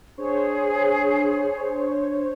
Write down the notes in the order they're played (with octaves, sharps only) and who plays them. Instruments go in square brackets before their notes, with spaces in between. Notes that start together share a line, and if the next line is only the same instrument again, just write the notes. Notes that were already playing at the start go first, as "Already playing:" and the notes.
[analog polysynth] D4 C5 C#5 [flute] G#4